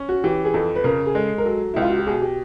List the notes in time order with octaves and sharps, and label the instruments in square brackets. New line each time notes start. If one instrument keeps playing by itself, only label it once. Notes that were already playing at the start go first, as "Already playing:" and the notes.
Already playing: [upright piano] C#4
[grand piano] F#4
[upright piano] E3 [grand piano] G4
[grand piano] G#4
[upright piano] F2 [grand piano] A4
[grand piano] B4
[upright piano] C#3 [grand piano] A#4
[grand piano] G#4
[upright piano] G#3 [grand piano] A4
[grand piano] A#4
[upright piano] F#3 [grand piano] A4
[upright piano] C#2 [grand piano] E4
[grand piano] F4
F#4
G4
[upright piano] B2 [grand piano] G#4
[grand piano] G4